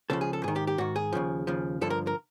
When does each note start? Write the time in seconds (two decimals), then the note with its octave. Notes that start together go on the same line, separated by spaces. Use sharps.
0.10 C#2 C#3 F3 A4
0.21 G#4
0.33 A4
0.44 G#2 D#3 G#4
0.56 G4
0.67 G4
0.78 G#2 D#3 F#4
0.96 G#4
1.13 D#2 C#3 F3
1.47 D#2 C#3 F3
1.81 G2 D3 F3 A4
1.90 A#4
2.07 A#4